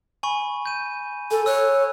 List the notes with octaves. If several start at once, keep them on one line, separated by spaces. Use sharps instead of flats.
G#5 B5 C#6
G6 D#7
A4 G#5
C#5 E6 F#6